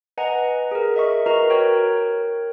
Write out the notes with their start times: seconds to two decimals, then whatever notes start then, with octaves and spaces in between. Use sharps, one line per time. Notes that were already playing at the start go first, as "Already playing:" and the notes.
0.18 B4 D#5 F#5 G#5 A#5
0.71 G#4 A#4
0.95 A#4 D#5 E5 C#6
1.26 F#4 A#4 B4 D#5 A#5
1.50 A#4 C#5 G5